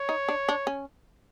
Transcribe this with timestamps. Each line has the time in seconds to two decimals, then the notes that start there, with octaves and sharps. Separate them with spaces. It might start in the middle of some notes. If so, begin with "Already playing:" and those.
Already playing: C#5
0.09 D#4
0.29 D4
0.49 D4
0.67 C#4